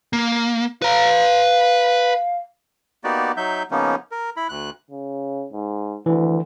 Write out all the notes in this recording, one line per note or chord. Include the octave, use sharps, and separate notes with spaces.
A#3
B4 F5 A#5
A#3 B3 D#4 F#4 G4 D5
F#3 D#4 E5 G6
C#3 F3 A#3 B3 C#4 D#4
A#4
E4 B5
D2 F#6
C#3
G#2
D2 E3